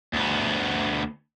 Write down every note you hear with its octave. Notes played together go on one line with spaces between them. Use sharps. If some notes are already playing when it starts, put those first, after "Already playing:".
D2 B3